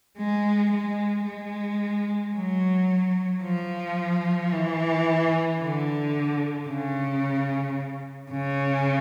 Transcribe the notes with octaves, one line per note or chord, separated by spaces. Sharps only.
G#3
G#3
G#3
F#3
F3
E3
D3
C#3
C#3